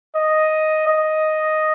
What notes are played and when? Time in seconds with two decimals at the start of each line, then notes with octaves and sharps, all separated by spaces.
0.15 D#5
0.87 D#5